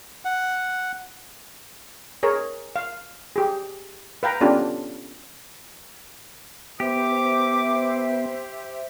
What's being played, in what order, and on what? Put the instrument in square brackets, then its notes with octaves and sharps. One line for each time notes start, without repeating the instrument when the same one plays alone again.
[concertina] F#5
[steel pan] G#4 A#4 C#5
F5
G4 G#4
B4 F5 G5 A#5
B3 C#4 D4 F4 G4 A4
[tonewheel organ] B3 [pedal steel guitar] G4 [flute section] C5 E5 [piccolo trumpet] D6